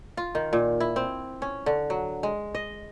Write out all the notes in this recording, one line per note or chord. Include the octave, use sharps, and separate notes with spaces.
F4
D#3
A#2
E4
C4
C#4
D3
F#3
G#3
D#5